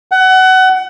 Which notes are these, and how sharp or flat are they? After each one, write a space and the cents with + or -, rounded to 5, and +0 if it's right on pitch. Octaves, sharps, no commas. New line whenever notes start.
F#5 +25